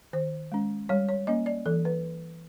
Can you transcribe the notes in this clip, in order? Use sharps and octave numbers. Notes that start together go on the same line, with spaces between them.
D#3 C5
G#3 C#4
G3 C#5
C#5
A#3 C#4 D#5
D5
E3 A4
B4